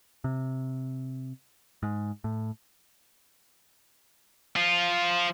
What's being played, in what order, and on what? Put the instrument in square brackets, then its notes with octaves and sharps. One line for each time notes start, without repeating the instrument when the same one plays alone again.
[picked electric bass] C3
G#2
A2
[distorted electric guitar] F3 F4